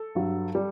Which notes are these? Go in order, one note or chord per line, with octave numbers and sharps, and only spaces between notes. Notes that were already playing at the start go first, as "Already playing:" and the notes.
Already playing: A4
G2 F#3
G3